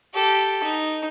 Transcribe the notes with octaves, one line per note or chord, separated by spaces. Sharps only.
G4 A4
D#4